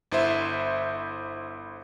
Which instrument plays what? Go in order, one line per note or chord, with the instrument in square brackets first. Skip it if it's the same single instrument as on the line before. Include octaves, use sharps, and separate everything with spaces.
[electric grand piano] G1 E4 C5 E5